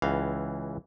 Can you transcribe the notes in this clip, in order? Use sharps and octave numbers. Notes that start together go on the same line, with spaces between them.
C#2 E3 F5